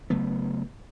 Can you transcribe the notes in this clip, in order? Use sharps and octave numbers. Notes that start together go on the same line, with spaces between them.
C#3 F#3 A3 B3